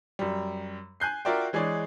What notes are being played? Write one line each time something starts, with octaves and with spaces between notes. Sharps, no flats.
F#2 G3
G#5 F#6 G6 C7
F4 F#4 A#4 D5 E5 G5
E3 G#3 G#4 C#5 D5